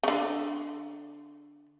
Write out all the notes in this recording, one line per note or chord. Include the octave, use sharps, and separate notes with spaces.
C#3
D3